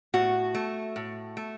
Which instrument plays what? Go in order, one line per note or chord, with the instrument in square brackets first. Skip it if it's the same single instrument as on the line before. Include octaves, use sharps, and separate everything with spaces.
[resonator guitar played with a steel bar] A2 F#4
A3
A2
A3